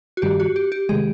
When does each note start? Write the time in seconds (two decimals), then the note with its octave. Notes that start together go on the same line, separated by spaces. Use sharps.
0.17 F#4
0.22 G2 D#3 G3 G4
0.40 F#4
0.56 G4
0.72 G4
0.89 C3 D#3 G#3 G#4